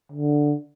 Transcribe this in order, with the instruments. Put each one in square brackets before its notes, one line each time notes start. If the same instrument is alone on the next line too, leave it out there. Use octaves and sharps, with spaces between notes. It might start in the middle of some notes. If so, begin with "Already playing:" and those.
[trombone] D3